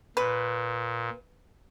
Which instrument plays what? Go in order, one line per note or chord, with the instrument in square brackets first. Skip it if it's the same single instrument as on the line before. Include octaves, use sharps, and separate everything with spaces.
[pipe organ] A#2 [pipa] B4